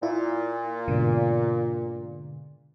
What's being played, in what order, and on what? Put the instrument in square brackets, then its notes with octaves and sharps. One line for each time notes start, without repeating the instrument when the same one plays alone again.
[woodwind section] A#2 [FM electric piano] E4
[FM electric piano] G#2 B2 D3